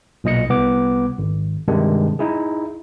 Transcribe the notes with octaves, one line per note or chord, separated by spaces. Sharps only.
B1 A#2 D#5 C#7
C2 B3 D6
G#1
G2 C3 D#3 G#3 D4
D#4 E4 G#4